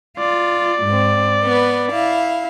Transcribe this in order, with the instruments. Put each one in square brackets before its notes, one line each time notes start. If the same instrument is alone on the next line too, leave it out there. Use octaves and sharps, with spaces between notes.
[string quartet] F4 [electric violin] D5
[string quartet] G#2 C4
B3 B4
E4 F5